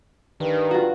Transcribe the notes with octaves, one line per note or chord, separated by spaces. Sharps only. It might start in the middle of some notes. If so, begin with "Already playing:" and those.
G2 D#3
F4 F#4